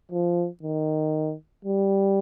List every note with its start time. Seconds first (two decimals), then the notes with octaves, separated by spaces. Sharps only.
0.12 F3
0.63 D#3
1.65 G3